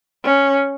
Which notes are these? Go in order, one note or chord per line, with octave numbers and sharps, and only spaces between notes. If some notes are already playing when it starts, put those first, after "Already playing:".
C#4